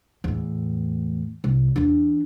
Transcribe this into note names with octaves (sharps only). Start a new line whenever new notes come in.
E2 A2
C2
E2 D4